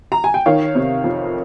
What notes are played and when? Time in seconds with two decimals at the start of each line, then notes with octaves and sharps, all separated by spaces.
0.12 A#5
0.24 G#5
0.34 G5
0.46 D#3 C#5 F5
0.75 C3
1.04 F2